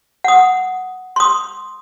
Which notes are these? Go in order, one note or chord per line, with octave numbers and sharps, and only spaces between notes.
F#5 D#6
C6 D#6